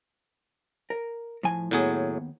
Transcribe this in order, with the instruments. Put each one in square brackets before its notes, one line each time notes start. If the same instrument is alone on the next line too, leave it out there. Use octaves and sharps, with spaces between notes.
[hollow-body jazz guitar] A#4
A2 F3 G#5
[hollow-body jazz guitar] D#2 B3 [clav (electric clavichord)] A2 F#3 G#4